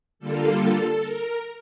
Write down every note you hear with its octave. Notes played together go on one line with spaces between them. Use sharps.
D3 G3 A#3 F4 A4
A#4